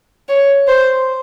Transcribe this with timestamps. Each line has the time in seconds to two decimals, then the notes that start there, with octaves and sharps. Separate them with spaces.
0.29 C#5
0.67 C5